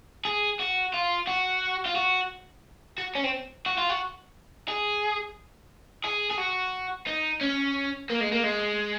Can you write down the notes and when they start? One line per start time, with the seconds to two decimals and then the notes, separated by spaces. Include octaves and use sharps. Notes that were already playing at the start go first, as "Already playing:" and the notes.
0.25 G#4
0.59 F#4
0.94 F4
1.27 F#4
1.86 F4
1.96 F#4
2.98 F#4
3.15 C#4
3.24 C4
3.66 F#4
3.78 F4
3.89 F#4
4.68 G#4
6.05 G#4
6.31 G#4
6.39 F#4
7.07 D#4
7.41 C#4
8.09 A#3
8.21 G#3
8.32 A#3
8.43 G#3